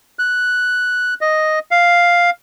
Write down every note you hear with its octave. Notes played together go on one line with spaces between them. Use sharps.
F#6
D#5
F5